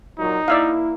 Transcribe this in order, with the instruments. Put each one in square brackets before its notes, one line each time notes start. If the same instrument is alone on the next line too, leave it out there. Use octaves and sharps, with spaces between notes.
[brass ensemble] A#2 F#3 [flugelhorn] D#4
[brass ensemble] A#3 E4 [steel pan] D5 E5 F5